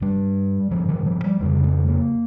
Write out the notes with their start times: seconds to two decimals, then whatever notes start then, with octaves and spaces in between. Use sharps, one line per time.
0.01 G2 G3
0.71 G2 F3
0.89 D#3
1.06 F3
1.24 G3
1.41 F2 C#3 G3
1.64 G#3
1.88 A#3